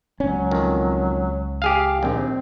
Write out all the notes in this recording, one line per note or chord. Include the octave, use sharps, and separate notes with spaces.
C#2 F#3 C#4
F2 D#3
G4 G#4 F5
A#1 D#2 C4